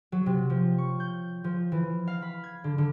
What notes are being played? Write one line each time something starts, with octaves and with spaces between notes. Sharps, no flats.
F#3
C3
F3
C#6
G6
F3
E3
F5
B5
G#6
D3
D3